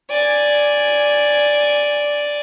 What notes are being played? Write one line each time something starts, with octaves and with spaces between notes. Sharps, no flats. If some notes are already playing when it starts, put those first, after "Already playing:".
D5 G#5